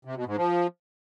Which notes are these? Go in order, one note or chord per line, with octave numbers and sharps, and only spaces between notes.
C3
B2
G#2
F3